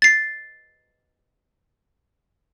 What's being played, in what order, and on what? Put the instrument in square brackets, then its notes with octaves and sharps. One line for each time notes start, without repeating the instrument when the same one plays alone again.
[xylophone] A6 C7